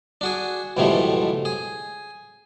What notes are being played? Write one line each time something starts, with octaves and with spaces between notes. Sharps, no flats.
D4 F#4 G#4
C#2 G2 B2 E3 F3 A3
G#4